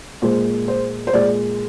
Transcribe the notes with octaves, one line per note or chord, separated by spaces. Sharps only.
A#2 G#3 C5
C5
C5
A#2 G#3 D5